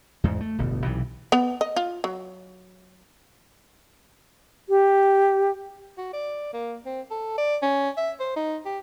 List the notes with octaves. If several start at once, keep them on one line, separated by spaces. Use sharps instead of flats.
E2 G#2
A3
D1 G1 B2
B1 C3 E3
B3
D#5
F4
F#3
G4
F#4
D5
A#3
C4
A4
D5
C#4
E5
C5
D#4
G4